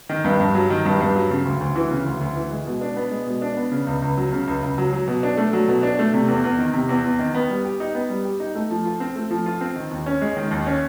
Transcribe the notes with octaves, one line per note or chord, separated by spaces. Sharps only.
D#3
G2
G2
F#3
D#3
G2
G2
F#3
C#3
D2
D2
E3
C#3
D2
D2
E3
G#3
B2
D4
B3
G#3
B2
D4
B3
C#3
C#2
C#2
F#3
C#3
C#2
C#2
F#3
F#3
B2
D4
A3
F#3
B2
D4
A3
C3
E2
E2
D#3
C3
E2
E2
D#3
B3
G3
G4
D#4
B3
G3
G4
D#4
A3
F3
F4
C4
A3
F3
F4
C4
D#3
D#2
C#4
G#3
D#3
D#2
C#4